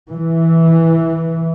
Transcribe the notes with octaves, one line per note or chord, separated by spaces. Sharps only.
E3